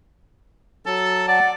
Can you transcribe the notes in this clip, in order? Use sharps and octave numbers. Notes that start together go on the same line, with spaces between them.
F#3 A4 A5
D5 F#5 A6